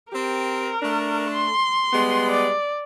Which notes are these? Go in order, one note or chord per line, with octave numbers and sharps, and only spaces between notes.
C4 G4 A#4
A3 D4
C6
G3 G#3 B3
D5